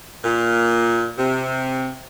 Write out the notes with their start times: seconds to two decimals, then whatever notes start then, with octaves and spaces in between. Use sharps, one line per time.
0.23 A#2
1.18 C3